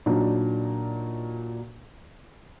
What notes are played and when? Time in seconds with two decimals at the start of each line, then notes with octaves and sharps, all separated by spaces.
0.06 A#2 F#3 D4 D#4